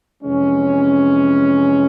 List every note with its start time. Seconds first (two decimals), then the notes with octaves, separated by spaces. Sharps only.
0.23 F2 C3 E3 G#3 C#4